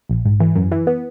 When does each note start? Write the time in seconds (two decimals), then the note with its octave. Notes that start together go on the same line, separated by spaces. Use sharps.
0.09 A#1
0.25 G#2
0.40 E3
0.56 F#2
0.72 E3
0.87 B3